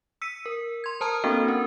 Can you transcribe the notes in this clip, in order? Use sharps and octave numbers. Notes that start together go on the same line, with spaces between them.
E6 B6 C#7 D#7
A#4
C6 G#6
A#4 C5 A5 A#5 D#6 F6
A#3 C4 D4 F#4 A4 C5
C#4 A#4